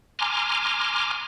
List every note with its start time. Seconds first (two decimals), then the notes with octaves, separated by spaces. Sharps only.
0.19 G#5 A#5 C6 D6 F6